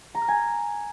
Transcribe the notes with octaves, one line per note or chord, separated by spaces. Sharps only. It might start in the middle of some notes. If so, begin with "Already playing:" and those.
A#5
F6
G#5